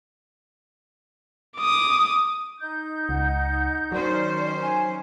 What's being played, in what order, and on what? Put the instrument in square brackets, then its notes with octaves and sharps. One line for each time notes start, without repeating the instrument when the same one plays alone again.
[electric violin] D6 D#6
[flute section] D#4 G6
[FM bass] C#2 [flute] F#5
[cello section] D#3 C#4 C5 [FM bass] F#3 [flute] D5
[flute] G#5